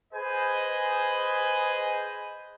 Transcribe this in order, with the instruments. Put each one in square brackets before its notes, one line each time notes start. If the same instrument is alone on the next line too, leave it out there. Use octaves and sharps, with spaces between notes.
[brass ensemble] G#4 B4 C5 D#5 G#5